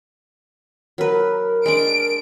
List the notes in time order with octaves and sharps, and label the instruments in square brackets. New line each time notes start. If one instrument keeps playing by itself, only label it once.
[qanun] F#3 B4 [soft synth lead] A#4
[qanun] G#3 D4 [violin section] D7